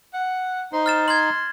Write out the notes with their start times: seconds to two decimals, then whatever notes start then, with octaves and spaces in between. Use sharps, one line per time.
0.14 F#5
0.73 D#4 C5
0.86 F6 A6 E7
1.08 C6 G#6 F#7